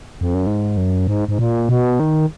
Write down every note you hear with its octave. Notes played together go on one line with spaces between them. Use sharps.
F2
F#2
G#2
F#2
G#2
G#2
A#2
B2
D#3